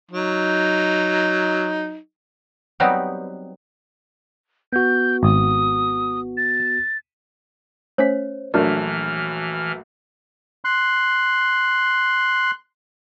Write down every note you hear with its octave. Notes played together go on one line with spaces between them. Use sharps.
F#3 D#4
F#3 G3 B3 C4 D#4 G4
B3 F#4 G6
G#1 D#6
A6
A3 C#4 C5 C#5 B6
A#1 E3 F#3 A3 D4 A#4 D5 F6
C6 F#6